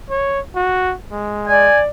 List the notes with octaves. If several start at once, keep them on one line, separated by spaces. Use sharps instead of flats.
C#5
F#4
G#3
D5 G#5